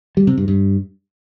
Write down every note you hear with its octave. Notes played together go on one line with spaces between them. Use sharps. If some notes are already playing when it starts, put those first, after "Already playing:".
G3
C3
G2
G2